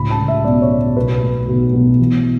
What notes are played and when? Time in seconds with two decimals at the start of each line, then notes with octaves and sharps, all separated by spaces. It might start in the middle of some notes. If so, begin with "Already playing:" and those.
Already playing: C#2 A2 B5
0.10 A5
0.19 C#2
0.28 E5
0.44 B2 D5
0.62 C#5
0.71 B2
0.97 B1 B4
1.22 A3
1.48 B1
1.74 B2
2.00 E3